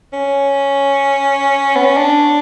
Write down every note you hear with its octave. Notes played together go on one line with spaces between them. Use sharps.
C#4
B3
C#4
D4